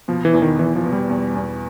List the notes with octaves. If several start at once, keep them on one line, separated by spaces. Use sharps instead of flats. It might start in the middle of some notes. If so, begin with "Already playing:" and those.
B2 F3
E3
E2
D#3
E2 E3
F3
B2
G3
E2
E2